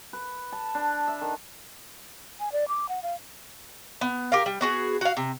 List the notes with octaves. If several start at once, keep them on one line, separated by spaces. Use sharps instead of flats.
B4
A5
D4
E5
D#3
G#5
D5
D6
F#5
F5
B3
G4 A#4 F5
G3
B3 F#4 G#4
F#4 F5
C3